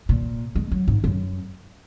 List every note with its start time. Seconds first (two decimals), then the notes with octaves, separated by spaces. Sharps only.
0.09 A#2
0.55 G#3
0.71 F#3
0.88 G#2
1.04 F#2